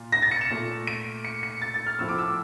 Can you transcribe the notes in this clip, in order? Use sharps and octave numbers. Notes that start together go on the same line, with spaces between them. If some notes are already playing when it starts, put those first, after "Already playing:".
Already playing: A#2
A#6
A6
C#7
E7
A#2 A3
D7
C#7
C#7
A6
A6
F6
A2 F3 A3 E6
D6
E6